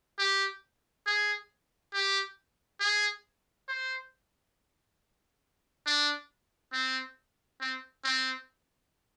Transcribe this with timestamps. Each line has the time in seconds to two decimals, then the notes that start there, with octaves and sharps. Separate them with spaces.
0.19 G4
1.06 G#4
1.93 G4
2.80 G#4
3.69 C5
5.86 D4
6.73 C4
7.61 C4
8.04 C4